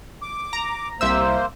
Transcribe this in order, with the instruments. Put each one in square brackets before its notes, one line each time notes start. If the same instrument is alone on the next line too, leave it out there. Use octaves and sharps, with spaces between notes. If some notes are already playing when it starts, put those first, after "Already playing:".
[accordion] D6
[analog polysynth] A#5
[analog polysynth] C2 E5 E6 [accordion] A#3 C5